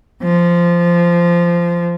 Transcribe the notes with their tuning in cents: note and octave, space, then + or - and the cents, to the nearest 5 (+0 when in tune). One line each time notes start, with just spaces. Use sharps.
F3 -15